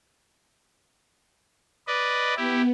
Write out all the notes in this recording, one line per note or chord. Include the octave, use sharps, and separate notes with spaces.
B4 D5 D#5
B3 E4 G4